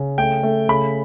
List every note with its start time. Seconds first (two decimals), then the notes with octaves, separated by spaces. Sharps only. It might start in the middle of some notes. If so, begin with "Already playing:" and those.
Already playing: C#3
0.18 A3 G5
0.43 A3
0.69 C#3 B5